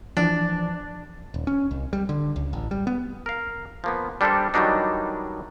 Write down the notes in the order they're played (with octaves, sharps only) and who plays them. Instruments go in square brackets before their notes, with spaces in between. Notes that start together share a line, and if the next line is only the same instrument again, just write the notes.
[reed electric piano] E3 F3 [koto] D4
[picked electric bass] D#1
C#4
C2
G3
D3
C#2
A1
G3
B3
[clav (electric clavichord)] A#4 F5
F3 A#3 B3
G3 D4 G4 A4 A#4 C5
D#3 E3 F#3 G3 D4 D#4